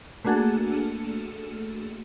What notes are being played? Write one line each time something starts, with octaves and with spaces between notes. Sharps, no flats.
A3 A#3 D4 F#4 G#4 A4